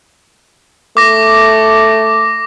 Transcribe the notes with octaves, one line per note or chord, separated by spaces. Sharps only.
A3 D6 A#6